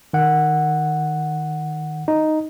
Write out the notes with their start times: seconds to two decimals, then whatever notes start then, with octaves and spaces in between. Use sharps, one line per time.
0.13 D#3 F#5
2.08 D#4